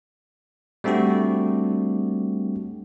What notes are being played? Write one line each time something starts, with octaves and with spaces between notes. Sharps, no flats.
G3 A3 C4 D4 F#4 G4